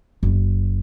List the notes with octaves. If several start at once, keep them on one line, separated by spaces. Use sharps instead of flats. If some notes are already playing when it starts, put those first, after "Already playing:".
F#1